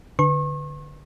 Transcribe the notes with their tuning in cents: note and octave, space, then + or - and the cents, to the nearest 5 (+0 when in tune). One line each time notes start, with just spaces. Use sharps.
D3 +0 B4 +10 C#6 -40